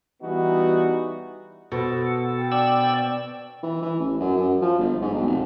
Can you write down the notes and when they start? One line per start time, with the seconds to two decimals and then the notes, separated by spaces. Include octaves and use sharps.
0.22 E3 G3 B3 D#4 F#4
1.72 B2 F#4 A4 B4 C5
2.37 G5
2.52 D4 D5 E6
3.63 E3
3.82 E3
4.00 A1
4.20 F#2
4.37 F#2
4.62 F3
4.79 G1
5.02 G#2
5.15 B1
5.27 F1